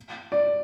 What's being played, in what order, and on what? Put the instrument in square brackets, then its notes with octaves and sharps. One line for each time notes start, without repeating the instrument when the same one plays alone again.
[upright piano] D5